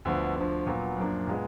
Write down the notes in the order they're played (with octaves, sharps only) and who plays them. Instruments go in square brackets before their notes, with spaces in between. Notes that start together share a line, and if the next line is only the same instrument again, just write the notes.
[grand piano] D2 D3 F3 B3
D2 D3 F3
A#2 F#3 B3
F#2 F3 A#3 D4
A#2 G#3 B3